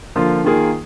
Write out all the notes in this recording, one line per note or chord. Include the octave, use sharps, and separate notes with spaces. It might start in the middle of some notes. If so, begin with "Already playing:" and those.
D3 F3 A#3 F4
D#3 A#3 F4 G#4